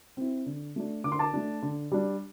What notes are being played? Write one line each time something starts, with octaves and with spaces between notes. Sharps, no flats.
C4 E4
D3
A3 D4
D3 D6
C6
A5 D6
A3 D4
D3
G3 D4